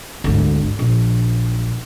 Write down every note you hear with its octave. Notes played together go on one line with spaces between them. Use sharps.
G#1 D2
A#1